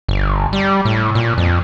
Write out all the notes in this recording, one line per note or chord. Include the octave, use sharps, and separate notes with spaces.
G1
G3
A2
A#2
F2